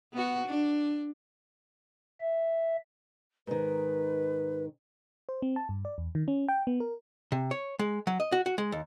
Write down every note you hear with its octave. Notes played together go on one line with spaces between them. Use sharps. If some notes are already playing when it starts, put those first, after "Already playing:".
B3 F#4
D4
E5
G#2 D#3 B4
C5
C4
A5
G2
D5
E2
D#3
C#4
G5
B3
A#4
C3
C#5
G#3
F#3
D#5
F#4
F#4
G#3
D#2